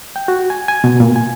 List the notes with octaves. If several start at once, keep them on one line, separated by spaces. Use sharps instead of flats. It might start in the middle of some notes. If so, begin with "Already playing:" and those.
G5
F#4
G#5
G#5
B2
A#2
G#5